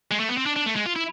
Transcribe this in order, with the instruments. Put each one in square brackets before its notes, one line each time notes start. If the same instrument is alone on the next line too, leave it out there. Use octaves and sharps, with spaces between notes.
[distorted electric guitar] G#3
A3
B3
C4
D4
D4
A3
G#3
F4
E4